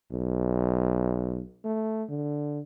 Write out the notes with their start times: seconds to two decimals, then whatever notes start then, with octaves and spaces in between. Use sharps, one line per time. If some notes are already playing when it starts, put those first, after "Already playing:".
0.12 B1
1.64 A3
2.09 D3